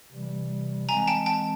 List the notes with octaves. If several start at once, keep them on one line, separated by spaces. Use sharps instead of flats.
C3 E3 G3
E3 G#3 C4 G#5 A#5
G5 A5
G5 A5